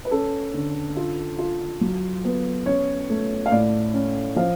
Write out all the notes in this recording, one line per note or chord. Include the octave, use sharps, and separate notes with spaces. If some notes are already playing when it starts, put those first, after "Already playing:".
B4
C#4 A4
D3
F4
F4
F#3
B3
C#4 C#5
A3
F5
A2 D5
C#4
F3 F5